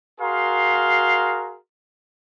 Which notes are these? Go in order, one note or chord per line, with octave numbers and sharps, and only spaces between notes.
F#4 G#4 A#4 F5 C6